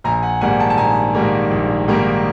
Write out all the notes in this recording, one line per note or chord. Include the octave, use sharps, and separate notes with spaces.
A#1 G#5 A#5
F#5 G#5
G#2 D#3 G3 A#3 F#5 G#5
G5 A5
A5
A#1 G#5 A#5
G#2 D#3 G3 A#3
A#1
G#2 D#3 G3 A#3